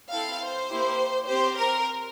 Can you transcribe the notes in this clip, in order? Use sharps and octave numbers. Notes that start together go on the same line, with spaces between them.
C4 E4 A4 F5
C5
A#3 E4 G4
C4 G4 C5
A#4